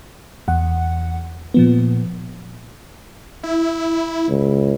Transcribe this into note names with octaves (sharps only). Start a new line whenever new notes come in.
E2 F#5
A#2 F3 B3
E4
C#2